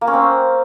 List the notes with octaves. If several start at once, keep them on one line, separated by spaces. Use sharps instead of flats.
A#3
C#4
C4